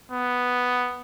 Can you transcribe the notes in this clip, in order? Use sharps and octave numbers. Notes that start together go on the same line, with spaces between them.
B3